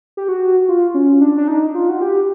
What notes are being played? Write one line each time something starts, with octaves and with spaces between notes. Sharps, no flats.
G4
F#4
F4
C#4
D4
D4
D#4
F4
F#4
G4